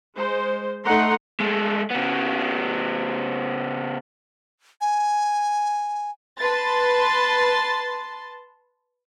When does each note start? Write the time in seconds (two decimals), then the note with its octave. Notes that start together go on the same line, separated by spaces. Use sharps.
0.15 G#3 C5
0.84 A3 D#4 F#5 A#5 C6
1.40 G#3 A3
1.90 C#3 B3
4.81 G#5
6.38 B4 A5 C6 A6